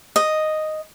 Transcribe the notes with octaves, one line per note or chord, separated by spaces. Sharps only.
D#5